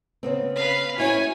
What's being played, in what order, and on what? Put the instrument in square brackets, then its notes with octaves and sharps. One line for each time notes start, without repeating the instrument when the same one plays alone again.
[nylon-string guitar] C#3 B3 C4
[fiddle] B4 F5
[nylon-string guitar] C#4 E4 F#4 [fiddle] C#5 G#5